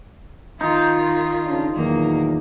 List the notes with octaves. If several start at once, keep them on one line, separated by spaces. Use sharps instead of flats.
D#3 D#4 F4
C#3 D4
E2 A#2 D#3 F#3 A#3